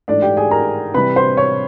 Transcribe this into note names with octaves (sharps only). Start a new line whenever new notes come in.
G#2 E3 A3 D4 D5
G4 G5
G#4 G#5
A#4 A#5
C3 E3 G3 B4 B5
C5 C6
C#5 C#6